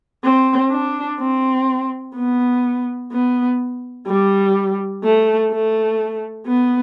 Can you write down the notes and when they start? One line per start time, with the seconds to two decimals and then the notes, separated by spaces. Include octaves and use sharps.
0.24 C4
0.71 D4
1.20 C4
2.15 B3
3.12 B3
4.07 G3
5.04 A3
5.51 A3
6.47 B3